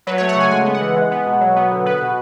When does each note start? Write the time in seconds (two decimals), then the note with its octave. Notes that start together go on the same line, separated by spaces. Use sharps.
0.07 F#3 B4
0.18 C#5
0.21 A3
0.29 F#5
0.36 C#3 G#5
0.51 G#3 G#5
0.66 B3
0.74 F#5
0.81 E3
0.96 G#3
1.11 B3
1.26 B2
1.41 F#3
1.56 B3
1.71 D3
1.86 B3 B4
2.02 B2